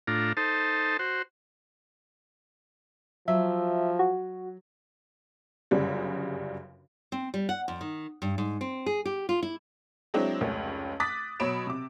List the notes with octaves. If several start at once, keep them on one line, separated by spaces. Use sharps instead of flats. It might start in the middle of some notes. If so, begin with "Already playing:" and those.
A2 D4 F4 A#5
D#4 A4 C5 A5
F#4 C5
F3 F#3 E5
F#4
G1 F#2 C#3 G3
C4
G3
F#5
F2
D#3
G2
G#2
C4
G#4
G4
F4
E4
F#3 G#3 C4 D4 E4
F1 C#2 C#4
D6 D#6 F#6 A6 B6
B2 F#3 C#5 B5 D7 E7
C3 D6